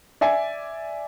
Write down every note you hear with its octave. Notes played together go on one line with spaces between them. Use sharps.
D5 E5 G#5